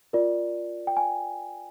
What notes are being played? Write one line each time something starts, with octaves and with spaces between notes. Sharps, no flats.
F4 A#4 D5
G5
G#5